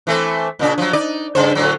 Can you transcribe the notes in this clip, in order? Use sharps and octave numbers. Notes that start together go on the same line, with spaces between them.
E3 A3 C4
A#2 C#3 D4
F3 F#3
D#4 D5
G2 C#3 C5
A2 D3 F#3